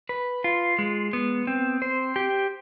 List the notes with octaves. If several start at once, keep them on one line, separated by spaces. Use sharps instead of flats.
B4
F4
G#3
B3
C4
C5
G4